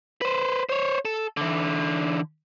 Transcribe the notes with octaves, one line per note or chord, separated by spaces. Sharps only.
B4 C5
C5 C#5
A4
D3 E3